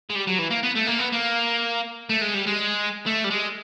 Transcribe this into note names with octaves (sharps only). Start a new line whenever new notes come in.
G#3
G3
F#3
E3
A#3
B3
A3
A#3
B3
A#3
A3
G#3
G3
G#3
A3
G3
G#3